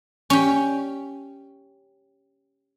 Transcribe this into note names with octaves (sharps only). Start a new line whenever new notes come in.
C#4 G4